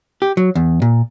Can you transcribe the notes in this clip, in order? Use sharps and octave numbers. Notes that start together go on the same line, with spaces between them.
G4
F#3
E2
A#2